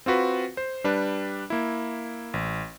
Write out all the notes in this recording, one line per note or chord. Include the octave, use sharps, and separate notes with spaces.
C4 F4 F#4 B4
C5
G3 D4 B4
A#3 E4
A1